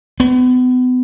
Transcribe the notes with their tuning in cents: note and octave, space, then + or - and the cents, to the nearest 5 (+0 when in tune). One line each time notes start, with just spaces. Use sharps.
B3 +35